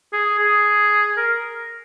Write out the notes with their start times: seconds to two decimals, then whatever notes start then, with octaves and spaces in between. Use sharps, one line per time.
0.13 G#4
0.39 G#4
1.17 A#4